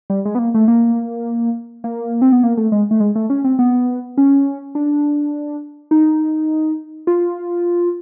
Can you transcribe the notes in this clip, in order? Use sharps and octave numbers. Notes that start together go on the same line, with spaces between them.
G3
G#3
B3
A#3
A3
A#3
A#3
C4
B3
A#3
A3
G#3
A3
G#3
A3
C#4
C4
B3
C#4
D4
D#4
F4